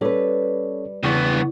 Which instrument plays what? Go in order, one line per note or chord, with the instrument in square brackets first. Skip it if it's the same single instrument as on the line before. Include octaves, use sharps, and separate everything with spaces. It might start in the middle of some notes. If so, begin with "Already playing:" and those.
[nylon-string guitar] G3 B4 [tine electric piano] C#4 A4 C#5
[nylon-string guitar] E2 [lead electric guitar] G2 B3 [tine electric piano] C#3 C#6